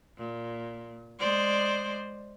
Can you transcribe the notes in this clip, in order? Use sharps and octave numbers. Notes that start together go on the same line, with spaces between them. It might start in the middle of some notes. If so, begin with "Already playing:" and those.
A#2
G#3 C5 D5